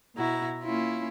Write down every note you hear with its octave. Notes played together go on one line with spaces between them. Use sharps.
B2 E4 F#4 A#5
A#3 C#4 E4 F4